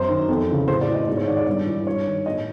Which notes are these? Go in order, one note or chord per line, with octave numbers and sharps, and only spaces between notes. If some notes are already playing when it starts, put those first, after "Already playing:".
Already playing: F#2 C5
D#3
F2
C#3 E3
A2 C5
D5
E3
D#5
G#2 D5
C#5
D#3 D5
D5
G2 D5
E3
G2 C#5
D#3
A2 D#5